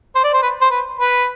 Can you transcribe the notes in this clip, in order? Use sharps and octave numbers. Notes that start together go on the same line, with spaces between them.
C5
D5
C5
B4
C5
B4
B4